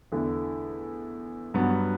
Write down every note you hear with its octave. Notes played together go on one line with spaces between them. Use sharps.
E2 D3 A3 E4
G2 F#3 B3